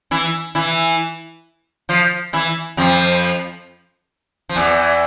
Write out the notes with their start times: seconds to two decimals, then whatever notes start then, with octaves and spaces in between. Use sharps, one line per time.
0.11 E3 E4
0.55 E3 E4
1.89 F3 F4
2.33 E3 E4
2.77 F2 F3
4.49 F3
4.56 E2 E3